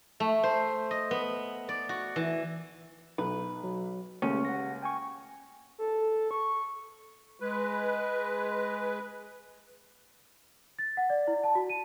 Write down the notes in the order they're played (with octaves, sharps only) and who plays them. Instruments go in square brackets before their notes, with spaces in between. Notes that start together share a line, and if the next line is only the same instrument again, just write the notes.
[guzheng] A3
C5
D#5
B3
D5
F#4
E3
[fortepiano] B1 [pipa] B4
[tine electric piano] F#3
[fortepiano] C#2 G4 [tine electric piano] A3 A#3 [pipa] C#4
[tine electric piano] F#5 A#6
G5 G#5 C#6
[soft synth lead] A4
C#6
[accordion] G#3 B4
[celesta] A6
F#5
D5
E4
A5
F#4
D#7